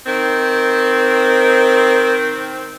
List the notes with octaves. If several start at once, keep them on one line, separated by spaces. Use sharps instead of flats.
D#3 C4